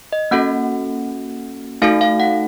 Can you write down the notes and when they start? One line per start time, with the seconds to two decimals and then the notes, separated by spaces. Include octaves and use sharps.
0.12 D#5
0.31 A#3 C#4 F#4 A4 F#5
1.82 A3 D#4 F#4 A4 F5
2.01 F5
2.20 F#5